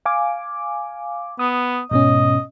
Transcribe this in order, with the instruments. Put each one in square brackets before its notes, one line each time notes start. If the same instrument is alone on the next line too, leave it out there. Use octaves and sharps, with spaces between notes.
[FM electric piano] F5 G#5 D6
[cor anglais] B3 [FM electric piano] D#6
[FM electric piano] G#2 B2 C#4 [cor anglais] D#5